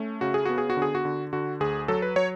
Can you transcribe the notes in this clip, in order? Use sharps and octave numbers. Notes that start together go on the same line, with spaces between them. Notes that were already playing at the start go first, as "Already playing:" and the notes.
Already playing: A3 C#4
C#3 F#4
G#4
B3 F#4
G#4
F#4
D3
G#4
F#4
D3
D3 F#4
D2 G#4
F#3 A4
B4
F#3 C#5